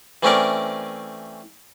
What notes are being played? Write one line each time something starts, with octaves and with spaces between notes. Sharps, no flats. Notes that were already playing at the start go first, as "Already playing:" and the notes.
E3 A3 C4 C#4 A#4 D5